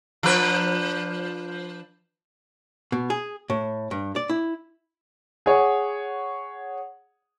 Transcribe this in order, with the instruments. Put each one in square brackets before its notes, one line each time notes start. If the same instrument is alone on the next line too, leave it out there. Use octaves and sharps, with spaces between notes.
[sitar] F3 D4 B4
[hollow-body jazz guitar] B2
G#4
A2
G2
D5
E4
[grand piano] G#4 C#5 F#5